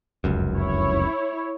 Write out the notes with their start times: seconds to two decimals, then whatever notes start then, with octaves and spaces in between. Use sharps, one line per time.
0.24 F1 C#2 F#2
0.56 E4 C#5